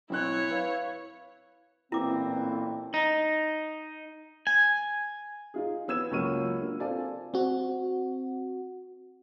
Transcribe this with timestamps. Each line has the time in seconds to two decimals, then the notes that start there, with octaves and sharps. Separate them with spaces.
0.10 B1 C4 E4 C#5 F#6
0.51 B4 F5
1.92 A1 A#2 E3 C4 E4 D6
2.94 D#4
4.47 G#5
5.54 D#4 F4 G#4
5.88 E3 B3 E6 G#6 E7
6.11 C#2 F#3 A#3 C#6 F6 D#7
6.61 A#3 D4
6.80 C4 F4 A4 D5 G#5 A5
7.34 C4 F#4